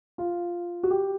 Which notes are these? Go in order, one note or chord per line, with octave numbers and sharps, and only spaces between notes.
F4
F#4
G4